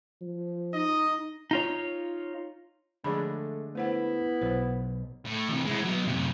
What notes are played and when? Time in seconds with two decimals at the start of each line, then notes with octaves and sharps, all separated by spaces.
0.21 F3
0.74 D#4 D#5
1.51 D#4 F4 C#5
3.04 D3 F3 G#3 A3 D4 G#4 B5
3.75 A3 B3 E4 C5 F#5
4.42 B1 C5
5.26 A2
5.48 C3 E3
5.66 G#3 E4
5.85 F#3 B3
6.08 F#2 C3